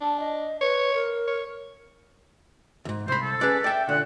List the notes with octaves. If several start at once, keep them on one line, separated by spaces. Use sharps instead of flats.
D4 A5
D#5
B4 C#5
A#4
C#5
D2 G#2
C2 C5 B5
A4
C#4 G#4 B4 D5
D5 E5 G5
A#2 D3 F#5